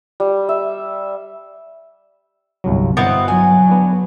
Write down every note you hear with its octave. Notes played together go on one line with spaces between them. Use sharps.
G3
E5
G1 C2 F#3
G1 B2 B3 C4 E4 B4
F#3 G#5
B3 D4